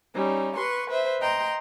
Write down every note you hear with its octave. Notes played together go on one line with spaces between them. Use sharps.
G3 C#4 D#4
B4 C6 C#6
B4 C5 E5
D#5 G5 A#5 C6